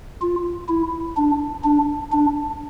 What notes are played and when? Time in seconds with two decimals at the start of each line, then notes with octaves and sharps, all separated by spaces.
0.22 F4
0.69 E4
1.17 D4
1.64 D4
2.12 D4